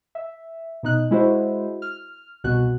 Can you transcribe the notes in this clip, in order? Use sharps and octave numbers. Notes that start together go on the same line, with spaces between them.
E5
B2 D#4 F#6
G#3 E4 F#4 C5
F6
C2 B2 F#4 F#6